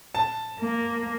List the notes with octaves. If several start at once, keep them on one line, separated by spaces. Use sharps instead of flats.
A5
A#3